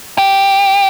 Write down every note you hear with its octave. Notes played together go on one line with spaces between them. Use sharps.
G4